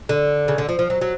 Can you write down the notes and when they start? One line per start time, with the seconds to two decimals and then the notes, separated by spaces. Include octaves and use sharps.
0.09 D3
0.48 C#3
0.58 D3
0.69 F3
0.79 F3
0.90 F#3
1.01 F#3